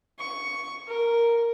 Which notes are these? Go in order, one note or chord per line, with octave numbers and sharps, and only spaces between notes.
C#6
A#4